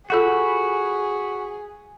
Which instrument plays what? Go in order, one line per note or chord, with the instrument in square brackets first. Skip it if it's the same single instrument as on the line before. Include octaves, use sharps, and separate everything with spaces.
[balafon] F4 A4 F#5 [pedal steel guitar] F#4 B5 [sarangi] G#4